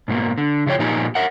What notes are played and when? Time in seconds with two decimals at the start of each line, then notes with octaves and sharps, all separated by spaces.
0.08 G#2 B2 A#3
0.38 D3
0.66 C#3 F3 G#4 C#5 G5
0.79 A#2 F3 A#3 D#4 G4 G#5
1.15 A#4 E5 F#5